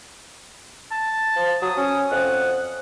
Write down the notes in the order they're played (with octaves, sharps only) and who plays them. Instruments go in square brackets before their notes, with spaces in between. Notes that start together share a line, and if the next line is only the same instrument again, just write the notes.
[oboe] A5
[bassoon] F3
[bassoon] F#3 [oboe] D#6
[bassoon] C#4
[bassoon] F2 [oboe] F#5